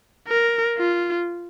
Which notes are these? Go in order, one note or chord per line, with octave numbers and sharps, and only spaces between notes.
A#4
F4